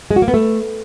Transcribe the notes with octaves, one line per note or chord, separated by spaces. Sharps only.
G#3
F#4
A#3
B3
A3